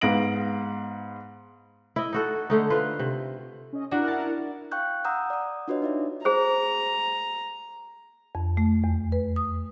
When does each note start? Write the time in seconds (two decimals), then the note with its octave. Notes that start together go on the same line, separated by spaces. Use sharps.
0.01 G#2 B3 F5 A#6 D7 F#7
1.96 E4 D#5
2.13 D#4 F#4 A4
2.50 D3 A3 D#4
2.70 F4 B4 C5
2.99 C3
3.73 C#4 D#5
3.91 D4 E4 F#4 A#4 F#5
4.08 A5
4.71 F5 G5 C#6 F#6 G6
5.04 F#5 A#5 D#6 E6 G6
5.30 D5 D#6
5.68 D4 F4 F#4 B4 C#5 D#5
5.82 D#4 D5 E5
6.25 G#4 C5 A#5
8.35 F2
8.57 A3
8.84 E2
9.12 B4
9.36 D#6